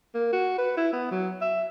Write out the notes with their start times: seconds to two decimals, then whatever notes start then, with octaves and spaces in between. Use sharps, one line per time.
0.15 A#3
0.33 F#4
0.58 B4
0.77 E4
0.93 B3
1.11 F#3
1.42 E5